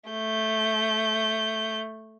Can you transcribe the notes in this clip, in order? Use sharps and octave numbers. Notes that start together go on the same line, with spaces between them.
A3 G6